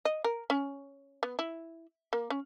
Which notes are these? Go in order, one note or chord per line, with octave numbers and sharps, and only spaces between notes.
D#5
A#4
C#4
B3
E4
A#3
C#4